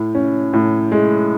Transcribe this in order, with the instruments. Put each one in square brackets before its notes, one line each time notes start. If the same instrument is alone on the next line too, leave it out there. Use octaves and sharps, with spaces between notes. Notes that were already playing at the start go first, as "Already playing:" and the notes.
Already playing: [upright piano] A2
C#4
A2
G#3